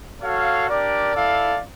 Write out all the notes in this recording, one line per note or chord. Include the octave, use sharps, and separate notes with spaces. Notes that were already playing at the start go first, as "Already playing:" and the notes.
F#4 A4 C#5 F5
D4 G4 A#4 D5
E4 A4 D5 F5